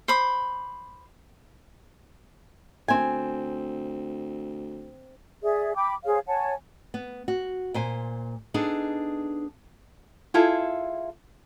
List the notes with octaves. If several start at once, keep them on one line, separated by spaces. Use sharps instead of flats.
C5 B5 D6
D2 C4 G#5
G#4 D5 E5
G5 B5 D6
G#4 C5 C#5 F5
C#5 F#5 G#5 A5
B3
F#4
A#2 C5 G#5
B3 D4 D#4 G#4 A4
E4 F4 G#4 A4